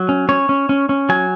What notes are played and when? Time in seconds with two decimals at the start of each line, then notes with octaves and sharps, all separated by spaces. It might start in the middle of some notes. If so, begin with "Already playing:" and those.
Already playing: F#3
0.09 C#4
0.29 C#4 C#5
0.49 C#4
0.69 C#4
0.89 C#4
1.09 F#3 G#5